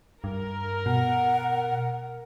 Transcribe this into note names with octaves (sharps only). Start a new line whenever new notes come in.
G2 A#4
B2 F#5